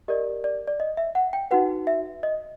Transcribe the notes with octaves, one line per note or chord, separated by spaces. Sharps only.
G4 A#4 D5 D#5
D5
D5
D#5
E5
F#5
G5
D#4 F#4 B4 F#5
E5
D#5